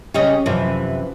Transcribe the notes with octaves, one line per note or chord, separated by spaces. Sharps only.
C#3 C#4 G4 C#5 D#5
F#2 C3 E3 F3 B4